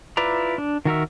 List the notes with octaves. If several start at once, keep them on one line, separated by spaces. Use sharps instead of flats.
E4 F4 B4 D5 A#5
D4
D#3 F#4 A#4 E5